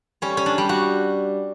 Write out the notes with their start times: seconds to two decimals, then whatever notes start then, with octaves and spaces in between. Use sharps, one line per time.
0.22 G3 C#4
0.37 C#4
0.46 D4
0.58 G3
0.69 F#4